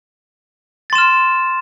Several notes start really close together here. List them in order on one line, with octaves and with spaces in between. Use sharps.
A6 C6 E7 F6